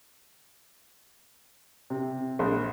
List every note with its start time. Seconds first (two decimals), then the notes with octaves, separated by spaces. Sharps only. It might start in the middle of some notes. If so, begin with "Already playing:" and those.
1.90 C3
2.39 A#1